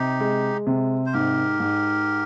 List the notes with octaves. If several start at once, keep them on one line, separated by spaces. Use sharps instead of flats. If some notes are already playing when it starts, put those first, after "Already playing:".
Already playing: C3 D#4 G4
G#3
C3
C5
G#2 G4 A#4
G#2